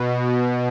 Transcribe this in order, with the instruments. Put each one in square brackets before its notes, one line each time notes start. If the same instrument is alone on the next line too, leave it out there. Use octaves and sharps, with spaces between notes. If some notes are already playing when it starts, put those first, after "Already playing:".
Already playing: [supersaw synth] B2